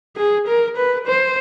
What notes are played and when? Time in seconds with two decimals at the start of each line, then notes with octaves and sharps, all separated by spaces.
0.17 G#4
0.47 A#4
0.76 B4
1.07 C5